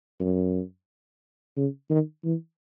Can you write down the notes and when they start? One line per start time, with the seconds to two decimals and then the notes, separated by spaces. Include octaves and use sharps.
0.20 F#2
1.57 C#3
1.90 D#3
2.24 E3